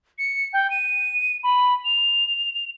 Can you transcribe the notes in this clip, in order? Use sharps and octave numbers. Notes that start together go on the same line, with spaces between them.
C#7
G5
D#7
B5
F7